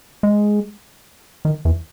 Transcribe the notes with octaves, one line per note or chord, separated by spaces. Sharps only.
G#3
D#3
E2